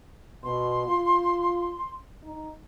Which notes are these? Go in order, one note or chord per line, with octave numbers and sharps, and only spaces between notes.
B2 C6
F4
D#4